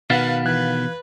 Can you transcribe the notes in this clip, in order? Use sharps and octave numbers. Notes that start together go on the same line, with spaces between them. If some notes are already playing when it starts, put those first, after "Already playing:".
B2 D#3 B3 B4 F5 F#5 A6
E3 B4 F#6 G#6